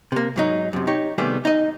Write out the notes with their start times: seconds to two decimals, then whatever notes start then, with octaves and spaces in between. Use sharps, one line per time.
0.12 C3 A#3
0.36 G#2 F#3 D#4
0.73 F#2 C3
0.87 D#4 G4 C#5
1.18 C3 D#3 G3 A3 B3 G#4
1.45 D#4 D#5